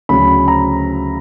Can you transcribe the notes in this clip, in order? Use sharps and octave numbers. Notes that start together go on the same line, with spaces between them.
D2 C#3 F#3 B5
A#5